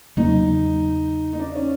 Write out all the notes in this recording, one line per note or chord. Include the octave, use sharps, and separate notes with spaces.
E2 C#3 F#3 A#3 D#4
D#4
D4
C#4